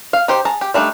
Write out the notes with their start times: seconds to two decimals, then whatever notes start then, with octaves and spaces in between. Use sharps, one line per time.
0.13 F5
0.28 D#4 G4 C5
0.45 G#4 A5 A#5
0.61 G4
0.74 G3 A3 D4 D#4